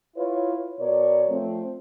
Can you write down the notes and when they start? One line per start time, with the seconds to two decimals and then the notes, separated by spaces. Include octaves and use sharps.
0.16 E4 F4 B4 C#5
0.79 B2 A#4 C#5 D5
1.29 F3 A3 C4